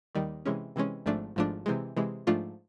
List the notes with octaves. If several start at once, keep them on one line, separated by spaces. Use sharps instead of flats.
D#2 D#3 G3
C3 E3 G#3 C#4
C3 E3 G#3 C#4
G#1 G#2 F3 A3 D4
G#1 G#2 F3 A3 D4
C3 E3 G#3
C3 E3 G#3
G#2 F3 A3 D4 F4